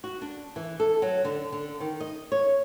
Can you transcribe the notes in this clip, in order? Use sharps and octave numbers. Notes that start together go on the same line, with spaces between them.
F#4
D4
E3
A4
F#3
D3
D3
D#3
D#5
C#5